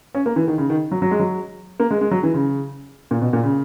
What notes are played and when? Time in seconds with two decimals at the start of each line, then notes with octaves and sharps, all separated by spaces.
0.15 C#4
0.26 A#3
0.36 E3
0.47 D#3
0.58 C#3
0.70 D#3
0.92 F#3
1.02 F#3
1.11 G#3
1.19 F#3
1.80 A#3
1.91 G#3
2.01 G#3
2.11 F#3
2.23 E3
2.34 C#3
3.11 A#2
3.21 B2
3.33 A#2
3.43 C#3